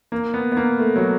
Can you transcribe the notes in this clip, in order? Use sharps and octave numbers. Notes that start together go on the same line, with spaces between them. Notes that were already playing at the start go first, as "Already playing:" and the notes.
A#3
B3
B3
A#3
A3
F#3